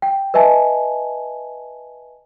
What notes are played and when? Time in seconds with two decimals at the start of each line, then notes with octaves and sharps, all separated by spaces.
0.02 G5
0.34 B4 D#5 E5 G#5 A5